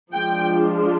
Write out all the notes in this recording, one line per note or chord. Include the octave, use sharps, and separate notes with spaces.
F3 G#3 D4 F4 G5